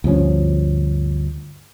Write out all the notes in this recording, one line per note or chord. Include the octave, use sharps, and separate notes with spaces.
D2 G2 F3 C#4